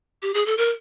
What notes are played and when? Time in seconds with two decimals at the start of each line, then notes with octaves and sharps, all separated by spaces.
0.22 G4
0.34 G#4
0.46 A4
0.58 A#4